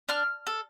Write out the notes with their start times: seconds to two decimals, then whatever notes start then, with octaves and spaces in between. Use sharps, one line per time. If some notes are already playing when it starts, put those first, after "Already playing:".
0.09 D4 F6
0.47 A4